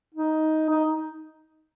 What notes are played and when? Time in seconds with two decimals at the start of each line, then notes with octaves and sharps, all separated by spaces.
0.14 D#4
0.70 D#4